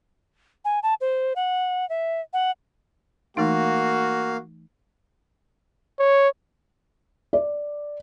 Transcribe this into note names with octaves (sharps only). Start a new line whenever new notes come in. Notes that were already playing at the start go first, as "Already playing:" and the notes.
G#5
A5
C5
F#5
E5
F#5
E3 A3 A#3 D#4 F#4 F5
C#5
D5